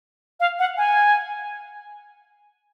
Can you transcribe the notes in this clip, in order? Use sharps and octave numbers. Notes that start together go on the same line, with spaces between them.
F5
F#5
G#5